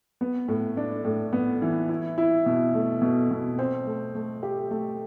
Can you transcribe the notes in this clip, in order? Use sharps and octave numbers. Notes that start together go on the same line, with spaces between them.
B3
A2
D4
A2
B3
E3
E4
E4
B2
A3
B2
B2
C4
A3
A3
G4
A3